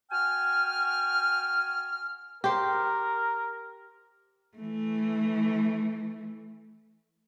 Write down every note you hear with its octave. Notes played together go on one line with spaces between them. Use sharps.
F#4 G5 G#5 F6
G4 A#4 C5
E3 A3